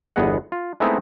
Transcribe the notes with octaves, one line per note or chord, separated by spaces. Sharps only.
G1 E2 B3 G#4 D#5 F#5
F4
G#3 A3 B3 C4 D#4 E4